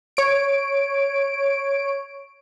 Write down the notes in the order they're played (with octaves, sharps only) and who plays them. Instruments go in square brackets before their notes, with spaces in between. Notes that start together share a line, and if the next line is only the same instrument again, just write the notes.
[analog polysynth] C#5 D7